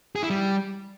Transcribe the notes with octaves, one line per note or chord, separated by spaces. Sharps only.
G#4
E4
G3